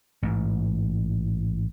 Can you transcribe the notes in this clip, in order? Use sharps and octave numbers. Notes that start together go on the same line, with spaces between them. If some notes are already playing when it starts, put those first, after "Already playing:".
A1 G#2